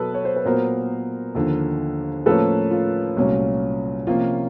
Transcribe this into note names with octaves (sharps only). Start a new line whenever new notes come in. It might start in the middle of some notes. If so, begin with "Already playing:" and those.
Already playing: B2 F#3 B3 A4 B4
C#5
C5
B4
A#2 F#3 B3 A#4 C5
D#2 D3 F3
A2 F3 A#3 C#4 A4 B4
F4
C2 A#2 F#3 A3 C#4
C3 F3 A#3 C#4 F4